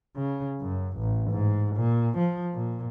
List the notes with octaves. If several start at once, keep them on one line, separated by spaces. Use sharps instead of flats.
C#3
F#2
A1
G#2
A#2
F3
A#2